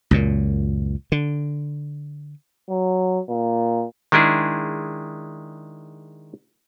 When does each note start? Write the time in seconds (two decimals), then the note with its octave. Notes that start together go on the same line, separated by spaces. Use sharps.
0.11 C#2 F#2 A#2
1.12 D3
2.69 F#3
3.29 A#2
4.12 D#3 G#3 D4 E4 G#4